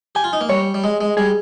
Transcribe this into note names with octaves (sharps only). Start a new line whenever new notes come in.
G4 G#5
F4
D#4
A#3
G3 C#5
G3
G#3
G#3
G3 G#4